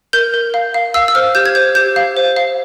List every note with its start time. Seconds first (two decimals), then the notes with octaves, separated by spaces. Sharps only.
0.13 A#4 G6
0.34 A#4
0.54 F5
0.74 F5
0.94 F5 E6
1.08 E6
1.15 C5 F6
1.35 G4 G6
1.46 G#6
1.55 C5 G6
1.75 G4 G6
1.96 F5
2.17 C5
2.36 F5